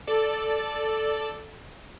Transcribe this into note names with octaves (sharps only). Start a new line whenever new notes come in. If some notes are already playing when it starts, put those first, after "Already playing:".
A4 D5